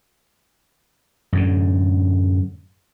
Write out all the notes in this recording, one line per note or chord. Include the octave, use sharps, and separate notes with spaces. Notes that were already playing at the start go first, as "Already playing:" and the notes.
F#2 A2 D3